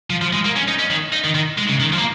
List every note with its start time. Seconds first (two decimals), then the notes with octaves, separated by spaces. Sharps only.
0.10 F3
0.22 F3
0.33 G#3
0.45 A#3
0.56 C#4
0.68 D#4
0.79 C#4
0.90 D#3
1.13 D#4
1.24 D#3
1.35 D#3
1.58 G#3
1.69 C#3
1.80 D#3
1.93 F3
1.98 A#3